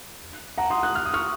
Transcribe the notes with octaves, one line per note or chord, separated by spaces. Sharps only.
F#5 A#5
C6 D#6
D#6 F#6
F6
D#6
C#6 F6